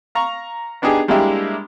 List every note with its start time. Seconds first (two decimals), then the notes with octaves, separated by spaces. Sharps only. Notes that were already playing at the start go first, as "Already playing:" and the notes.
0.15 F5 A#5 C#6
0.82 B3 D4 D#4 G4 G#4
1.08 G3 G#3 A#3 D4 E4 G4